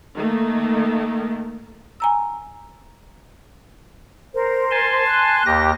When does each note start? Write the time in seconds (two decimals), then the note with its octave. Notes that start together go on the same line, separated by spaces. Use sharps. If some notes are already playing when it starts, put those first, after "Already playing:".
0.16 D#3 A3 A#3
2.00 G#5 A#5 E6
4.34 A#4 C5
4.71 G#5 A5 C6
5.07 F#6
5.45 D#2 G4 A#6